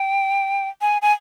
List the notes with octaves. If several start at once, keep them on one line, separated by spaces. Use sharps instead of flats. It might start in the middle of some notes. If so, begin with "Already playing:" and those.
Already playing: G5
G#5
G#5